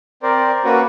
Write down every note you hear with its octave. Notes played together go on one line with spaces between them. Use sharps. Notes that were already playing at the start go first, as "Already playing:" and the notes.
C4 A#4 C5 D5
A#3 C#4 F#4 B4